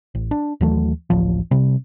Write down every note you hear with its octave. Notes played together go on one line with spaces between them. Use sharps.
A1
D4
D#2 E3 F#3 A3
D1 A1 F3
C3 G3